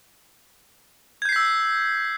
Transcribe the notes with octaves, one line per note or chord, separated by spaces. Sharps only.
E6 G6 G#6 B6 C7